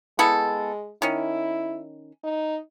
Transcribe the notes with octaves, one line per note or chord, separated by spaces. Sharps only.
G#3 B3 E4 A4
D#3 C#4 E4
D#4